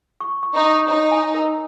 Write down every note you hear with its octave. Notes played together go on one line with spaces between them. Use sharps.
C#6
C#6
D#4
C#6
D#4 C#5
G#5
A#4